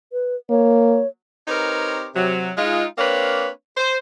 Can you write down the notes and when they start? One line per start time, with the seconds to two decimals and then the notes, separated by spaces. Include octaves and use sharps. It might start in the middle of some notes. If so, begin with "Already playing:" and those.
0.13 B4
0.50 A#3 C#5
1.48 C4 D#4 G4 A#4 B4 C#5
2.15 C3 F#3
2.57 G#3 D#4 F4
2.98 A#3 C4 D4 B4 C#5 F5
3.77 C5